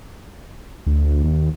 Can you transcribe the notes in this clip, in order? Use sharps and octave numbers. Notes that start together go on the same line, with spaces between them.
D2
D#2